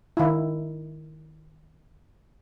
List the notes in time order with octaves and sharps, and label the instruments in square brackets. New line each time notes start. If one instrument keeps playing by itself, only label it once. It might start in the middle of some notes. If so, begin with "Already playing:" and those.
[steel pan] D#3 E4